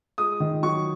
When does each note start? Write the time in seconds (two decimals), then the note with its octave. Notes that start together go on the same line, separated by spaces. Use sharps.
0.18 G#3 D#6
0.40 D#3
0.63 F#3 C#6